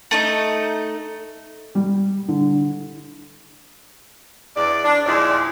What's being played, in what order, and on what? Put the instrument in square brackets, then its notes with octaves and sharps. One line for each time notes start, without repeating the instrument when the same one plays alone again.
[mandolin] A3 D#4 D#5
[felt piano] G3
D3
[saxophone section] E2 D5
D4
D#2 A#2 F3 G#3 E4 D5